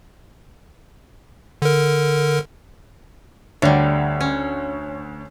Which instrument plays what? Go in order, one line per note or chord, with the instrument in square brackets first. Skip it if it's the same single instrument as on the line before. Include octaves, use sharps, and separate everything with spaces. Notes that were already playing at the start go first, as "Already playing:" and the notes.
[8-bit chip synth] D3 A#4
[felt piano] D2 C#5 [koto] D3 G3
[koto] C#4